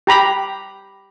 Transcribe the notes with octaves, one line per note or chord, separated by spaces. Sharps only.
G4 A#5 B5